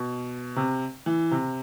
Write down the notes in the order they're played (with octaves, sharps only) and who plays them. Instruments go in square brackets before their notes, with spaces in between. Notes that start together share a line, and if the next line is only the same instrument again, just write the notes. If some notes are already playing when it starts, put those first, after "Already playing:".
Already playing: [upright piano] B2
C3
E3
C3